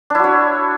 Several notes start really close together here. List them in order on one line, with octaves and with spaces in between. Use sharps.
D4 E4 F#4 C#5